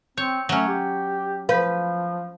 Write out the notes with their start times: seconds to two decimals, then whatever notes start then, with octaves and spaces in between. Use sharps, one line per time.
0.17 C4 C#5 G6
0.49 F#3 A3 C#4
0.68 G4
1.49 F3 B4 F5 G6